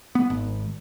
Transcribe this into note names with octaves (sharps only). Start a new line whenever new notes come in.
B3
G#1